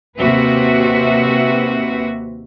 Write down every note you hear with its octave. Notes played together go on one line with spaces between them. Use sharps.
D#2 C3 C4 F#4 B4 E5